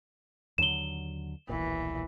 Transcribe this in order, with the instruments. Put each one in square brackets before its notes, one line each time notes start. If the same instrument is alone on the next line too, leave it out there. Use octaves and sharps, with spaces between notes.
[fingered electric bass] D#2 D3 F#3 [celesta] E7 G7
[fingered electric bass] D#1 B1 A#2 [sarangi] E3